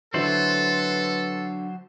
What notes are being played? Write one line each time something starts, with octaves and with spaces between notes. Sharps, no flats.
D3 F#3 E4 A4 B4 C5 F#7